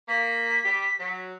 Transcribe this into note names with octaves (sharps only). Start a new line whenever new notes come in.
A#3 B6
G3 G4
F#3